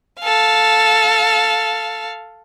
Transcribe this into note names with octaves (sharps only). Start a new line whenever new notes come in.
A4 F5